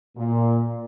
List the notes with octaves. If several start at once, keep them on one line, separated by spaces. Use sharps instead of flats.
A#2